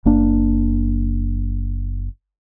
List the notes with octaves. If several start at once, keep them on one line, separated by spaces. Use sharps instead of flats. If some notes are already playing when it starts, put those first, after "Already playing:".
F#1 A#3 D4